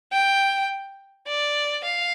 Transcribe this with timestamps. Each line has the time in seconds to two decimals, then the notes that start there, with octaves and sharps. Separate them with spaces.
0.12 G5
1.27 D5
1.84 F5